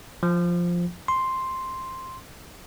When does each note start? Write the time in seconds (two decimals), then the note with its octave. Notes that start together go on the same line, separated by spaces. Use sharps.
0.23 F3
1.08 C6